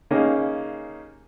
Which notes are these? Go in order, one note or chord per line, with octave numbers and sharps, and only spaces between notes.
C#3 A#3 C#4 D#4 G4